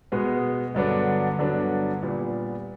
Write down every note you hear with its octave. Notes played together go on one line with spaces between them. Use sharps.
B2 G#3 B3
G2 D3 F#3 B3 D4
G2 D3 F#3 B3 D4
A#2 G3 B3